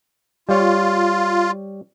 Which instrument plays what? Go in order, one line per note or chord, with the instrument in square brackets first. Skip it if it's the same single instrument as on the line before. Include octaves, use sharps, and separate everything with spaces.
[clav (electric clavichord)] G3 C#5 [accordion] F4